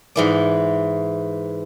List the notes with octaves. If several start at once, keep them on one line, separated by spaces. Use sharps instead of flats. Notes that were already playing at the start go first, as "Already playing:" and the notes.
G#2 E3 D5